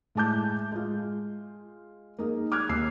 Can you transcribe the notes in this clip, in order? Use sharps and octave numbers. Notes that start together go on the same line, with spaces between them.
A2 G#3 A5 D6 G6
G#3 F4
A#3 D#4 G#4
D6 F6 F#6 G#6
D#2 E6 C7